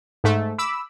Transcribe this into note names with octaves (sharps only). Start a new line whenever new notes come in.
G#2 A3
B5 D6 E6